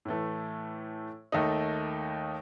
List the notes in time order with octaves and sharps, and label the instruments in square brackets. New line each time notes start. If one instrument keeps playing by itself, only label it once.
[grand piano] A2 E3 A3
D#2 D#3 A3 D#4